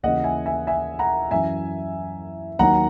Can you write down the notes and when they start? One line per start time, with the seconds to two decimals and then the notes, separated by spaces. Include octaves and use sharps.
0.03 D#2 C#3 E3 D#5 F#5
0.24 E5 G#5
0.46 E5 G#5
0.67 E5 G#5
0.99 F#5 A#5
1.31 F#2 E3 E5 G#5
2.59 D#2 D#3 F#3 F#5 A#5